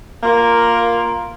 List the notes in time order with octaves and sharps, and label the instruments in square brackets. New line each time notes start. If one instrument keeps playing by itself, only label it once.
[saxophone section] A#3 F4 A#4